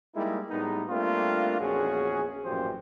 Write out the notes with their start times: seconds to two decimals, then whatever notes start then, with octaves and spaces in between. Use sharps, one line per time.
0.15 G3 G#3 A#3 D#4 E4
0.50 A2 G3 G#3 B3 D#4
0.90 G3 A3 A#3 C4 D4 F4
1.60 A#1 E2 C#4 F#4 G#4
2.45 A1 F#2 A#2 F3 G4 C5